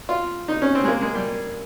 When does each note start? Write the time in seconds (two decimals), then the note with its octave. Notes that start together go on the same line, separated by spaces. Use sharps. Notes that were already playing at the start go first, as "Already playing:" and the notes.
0.09 F4
0.48 D#4
0.62 C#4
0.75 C4
0.84 G#3
0.88 A#3
1.01 G#3
1.15 G3